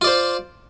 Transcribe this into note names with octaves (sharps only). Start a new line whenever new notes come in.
F4 C5 D5